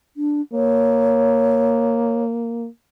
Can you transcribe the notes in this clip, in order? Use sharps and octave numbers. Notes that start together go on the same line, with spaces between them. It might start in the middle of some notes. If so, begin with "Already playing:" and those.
D4
A#3 C#5